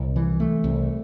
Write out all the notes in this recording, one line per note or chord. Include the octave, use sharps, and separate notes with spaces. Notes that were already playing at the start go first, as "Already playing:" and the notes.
Already playing: C2
E3
A3
C2